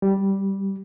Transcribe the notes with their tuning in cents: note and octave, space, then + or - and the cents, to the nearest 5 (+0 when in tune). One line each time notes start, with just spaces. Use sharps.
G3 -5